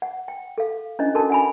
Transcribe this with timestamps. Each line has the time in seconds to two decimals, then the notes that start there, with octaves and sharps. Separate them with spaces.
0.02 F#5
0.28 G5
0.58 A4 F5
0.99 C#4 D4 E4 C5 D#5
1.14 D4 F#4 A4 A#4 A5
1.30 F#5 G#5 B5